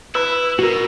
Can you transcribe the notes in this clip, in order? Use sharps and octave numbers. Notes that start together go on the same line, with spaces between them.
E4 B4 E6
B2 F#4 A#4